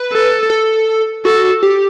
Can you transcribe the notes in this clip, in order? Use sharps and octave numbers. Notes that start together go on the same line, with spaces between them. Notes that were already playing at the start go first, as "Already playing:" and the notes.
Already playing: B4
A4
A4
F#4 A4
G4